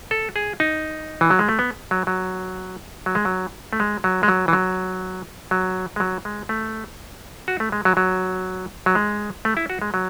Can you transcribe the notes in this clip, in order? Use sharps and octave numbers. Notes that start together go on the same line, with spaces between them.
A4
G#4
D#4
E3
F#3
G#3
A3
B3
F#3
F#3
F#3
G#3
F#3
A3
G#3
F#3
G#3
F#3
E3
F#3
F#3
G#3
F#3
G#3
A3
F#4
A3
G#3
F#3
F#3
F#3
G#3
A3
E4
F#4
G#3
F#3